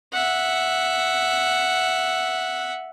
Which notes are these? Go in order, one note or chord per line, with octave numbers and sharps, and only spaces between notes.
E5 F#5